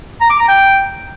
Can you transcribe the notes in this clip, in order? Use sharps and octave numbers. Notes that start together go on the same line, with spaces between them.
A#5
D6
A#5
G5